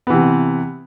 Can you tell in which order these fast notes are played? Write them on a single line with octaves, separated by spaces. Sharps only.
B3 E3 C3